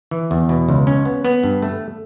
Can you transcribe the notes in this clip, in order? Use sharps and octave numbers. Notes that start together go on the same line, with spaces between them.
E3
E2
B2
C#2
C#4
B3
B3
G2
A3